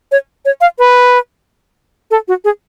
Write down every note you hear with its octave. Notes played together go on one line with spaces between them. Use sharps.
C#5
C#5
F5
B4
A4
F#4
G#4